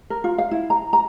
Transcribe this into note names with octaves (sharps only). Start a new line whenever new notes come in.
A#4
F4
F5
E4
A#5
A#5